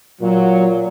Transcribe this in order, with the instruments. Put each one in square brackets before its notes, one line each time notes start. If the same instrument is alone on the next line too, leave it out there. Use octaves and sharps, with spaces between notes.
[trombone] A#2 [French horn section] F#3